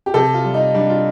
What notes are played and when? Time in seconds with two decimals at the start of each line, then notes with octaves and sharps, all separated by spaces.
0.06 G4
0.14 C3 A4
0.34 F4
0.44 G3
0.54 D#4
0.74 G3 D4
0.90 F4